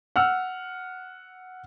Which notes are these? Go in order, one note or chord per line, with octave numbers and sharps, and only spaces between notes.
F#5 E6 F6